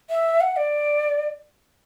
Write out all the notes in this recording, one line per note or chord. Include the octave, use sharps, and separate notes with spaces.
E5
F#5
D5